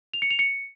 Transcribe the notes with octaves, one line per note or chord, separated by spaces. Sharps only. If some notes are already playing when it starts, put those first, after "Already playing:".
F7
C#7
F7
C#7